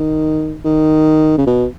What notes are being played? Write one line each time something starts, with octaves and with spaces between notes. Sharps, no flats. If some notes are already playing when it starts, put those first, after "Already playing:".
Already playing: D#3
D#3
C#3
B2